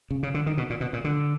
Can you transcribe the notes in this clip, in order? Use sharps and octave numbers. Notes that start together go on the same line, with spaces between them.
C#3
C#3
D3
D#3
B2
A#2
B2
A#2
D3